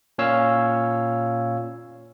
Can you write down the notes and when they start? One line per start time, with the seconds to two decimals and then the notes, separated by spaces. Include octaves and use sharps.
0.18 A#2 C#4 C#5 F5 E6